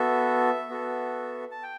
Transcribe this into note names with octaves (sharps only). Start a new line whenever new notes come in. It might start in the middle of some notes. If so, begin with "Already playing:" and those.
Already playing: B3 F#4 A4 E5
B3 F#4 A4
A5
G5